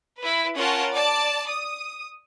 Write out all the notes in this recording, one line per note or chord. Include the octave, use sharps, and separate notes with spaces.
E4 B4
C#4 F4 A#4 C#5 F#5 A5
D5 A5
D#6